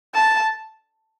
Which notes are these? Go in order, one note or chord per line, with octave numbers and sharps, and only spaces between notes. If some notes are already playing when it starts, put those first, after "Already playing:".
A5